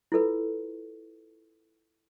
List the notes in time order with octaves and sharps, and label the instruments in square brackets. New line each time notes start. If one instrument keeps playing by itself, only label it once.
[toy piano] E4 F4 A4 B4